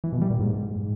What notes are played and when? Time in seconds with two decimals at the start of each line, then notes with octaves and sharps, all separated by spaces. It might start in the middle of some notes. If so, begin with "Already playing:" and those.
0.04 E3
0.13 B2
0.21 G3
0.30 A#2
0.39 G#2